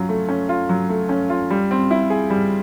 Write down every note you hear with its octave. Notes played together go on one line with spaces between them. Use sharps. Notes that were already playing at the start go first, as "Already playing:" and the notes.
Already playing: F#3 C#4 F4
A3
C#4
F4
F#3
A3
C#4
F4
G3
C4
E4
G#4
G3